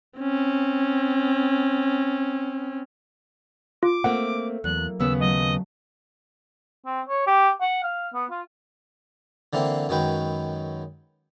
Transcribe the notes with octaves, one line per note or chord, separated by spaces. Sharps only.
C4 C#4
F4 D6
A3 A#3 C4 F#5
E2 F#3 A#3 F#6
D#2 C#3 B3 E6
F#3 G#3 A3 D#5
C4
C#5
G4
F#5
F5
B3
F4
D3 E3 A#3 C4
F#2 D#3 F#3 G#3 B4 G5